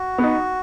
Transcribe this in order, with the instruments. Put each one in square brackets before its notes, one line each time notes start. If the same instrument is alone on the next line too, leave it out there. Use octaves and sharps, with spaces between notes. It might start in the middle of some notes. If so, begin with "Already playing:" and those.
Already playing: [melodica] F#4
[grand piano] B3
D#4